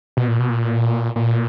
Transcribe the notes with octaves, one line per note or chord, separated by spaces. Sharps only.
B2
A#2
B2
A#2
A#2